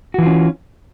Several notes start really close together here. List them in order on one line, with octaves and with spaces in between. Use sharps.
F#4 E3 F4 C#4